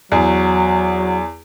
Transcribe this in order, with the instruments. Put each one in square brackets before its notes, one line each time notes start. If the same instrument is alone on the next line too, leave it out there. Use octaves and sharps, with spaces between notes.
[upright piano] E2 [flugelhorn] F#3